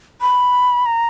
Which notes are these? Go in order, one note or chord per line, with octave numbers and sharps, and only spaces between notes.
B5
A#5